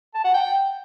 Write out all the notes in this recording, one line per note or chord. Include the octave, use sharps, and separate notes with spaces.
A5
F#5
G5